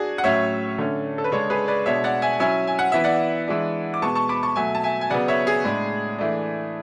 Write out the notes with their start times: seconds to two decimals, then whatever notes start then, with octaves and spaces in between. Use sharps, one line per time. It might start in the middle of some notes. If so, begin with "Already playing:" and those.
Already playing: D4 F#4 G#4
0.18 F#5
0.24 A2 F#3 C#4 C#5 E5
0.78 D3 A3 C#4
1.18 A4
1.24 B4
1.32 C#3 G#3 D4 A4 C#5
1.50 G#4 B4
1.68 B4 D5
1.86 B2 G#3 D4 C#5 E5
2.04 D5 F#5
2.22 E5 G#5
2.40 F#3 C#4 E4 E5 G#5
2.67 G#5
2.79 F#5
2.92 E3 B3 E4 E5
3.04 D5 F#5
3.48 E3 G#3 D4
3.94 D6
4.02 B2 G#3 B3 A5 C#6
4.15 A5 C#6
4.29 B5 D6
4.43 A5 C#6
4.56 B2 F#3 A3 E5 G#5
4.75 A5
4.83 E5 G#5
5.01 G#5
5.10 C#3 F#3 B3 D5 F#5
5.28 C#5 E5
5.47 G#4
5.64 A2 G#3 D4
6.18 E3 A3 D4